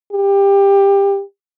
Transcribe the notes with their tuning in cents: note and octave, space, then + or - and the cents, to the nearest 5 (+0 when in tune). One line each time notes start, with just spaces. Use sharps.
G4 +20